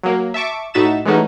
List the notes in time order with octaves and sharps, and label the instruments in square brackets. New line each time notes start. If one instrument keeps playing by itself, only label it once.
[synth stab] F#3 A#3
E5 A5 C#6 D6
A2 D#4 F#4 E5 A6 E7
E3 G#3 A3 C#4 D#4 F#4